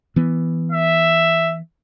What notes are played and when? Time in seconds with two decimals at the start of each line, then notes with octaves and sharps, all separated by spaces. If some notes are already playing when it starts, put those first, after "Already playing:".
0.16 E3 B3
0.72 E5